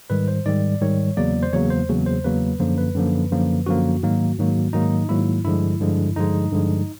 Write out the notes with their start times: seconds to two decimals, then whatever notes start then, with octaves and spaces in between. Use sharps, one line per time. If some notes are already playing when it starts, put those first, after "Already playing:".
0.10 G#2 D#3 G3 B4
0.28 C5
0.45 G#2 D#3 G3 D5
0.81 G#2 D#3 G3 C#5
1.17 E2 C#3 F#3 A#3 D5
1.43 C5
1.53 E2 C#3 F#3 A#3 C#5
1.70 C5
1.88 E2 C#3 F#3 A#3
2.06 C5
2.24 E2 C#3 F#3 A#3 B4
2.59 F#2 D3 F3 A#3 C5
2.78 B4
2.95 F#2 D3 F3 A#3
3.31 F#2 D3 F3 A#3
3.66 F#2 D3 F3 A#3 F#4
4.03 G#2 D#3 F#3 A#3
4.38 G#2 D#3 F#3 A#3
4.73 G#2 D#3 F#3 A#3 D#4
5.09 G#2 D#3 F#3 A#3 E4
5.44 G2 D3 F3 G#3 E4
5.80 G2 D3 F3 G#3
6.16 G2 D3 F3 G#3 D#4
6.52 G2 D3 F3 G#3